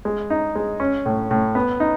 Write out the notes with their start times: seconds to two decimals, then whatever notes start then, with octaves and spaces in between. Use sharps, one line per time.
0.05 G#3
0.30 D#4
0.56 G#3
0.80 C#4
1.06 A2
1.31 A2
1.55 B3
1.80 D#4